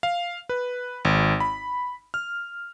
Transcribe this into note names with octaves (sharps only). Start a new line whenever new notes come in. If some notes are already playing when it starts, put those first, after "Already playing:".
F5
B4
G#1
B5
F6